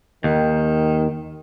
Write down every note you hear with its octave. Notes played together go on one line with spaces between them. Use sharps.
D#2 D#3